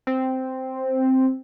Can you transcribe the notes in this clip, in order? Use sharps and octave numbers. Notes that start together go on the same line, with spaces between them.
C4